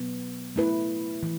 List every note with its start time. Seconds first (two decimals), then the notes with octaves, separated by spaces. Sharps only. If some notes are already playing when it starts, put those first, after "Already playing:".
Already playing: B2 F#3 B3
0.56 A3 E4 B4
1.23 E3